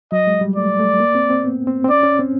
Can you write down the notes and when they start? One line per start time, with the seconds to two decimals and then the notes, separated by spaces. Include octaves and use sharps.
0.12 F#3 D#5
0.27 G#3
0.41 G3
0.56 A3 D5
0.79 A3
1.00 A#3
1.15 C4
1.30 C4
1.45 B3
1.67 C4
1.84 C4
1.89 C#4 D5
2.03 C#4
2.19 C4